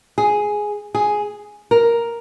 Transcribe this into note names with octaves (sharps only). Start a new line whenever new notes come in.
G#4
G#4
A#4